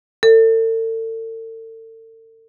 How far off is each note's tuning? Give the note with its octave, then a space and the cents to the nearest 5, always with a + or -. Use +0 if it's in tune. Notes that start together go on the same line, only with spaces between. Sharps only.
A4 +40 D5 +0